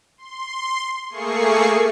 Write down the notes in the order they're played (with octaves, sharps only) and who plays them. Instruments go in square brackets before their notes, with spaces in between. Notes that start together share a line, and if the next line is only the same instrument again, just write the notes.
[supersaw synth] C6
A3 A#3 G#4 C#6 C7